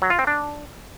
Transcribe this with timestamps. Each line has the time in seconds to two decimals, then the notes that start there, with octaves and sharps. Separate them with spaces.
0.02 F#3
0.10 F4
0.19 C4
0.27 D4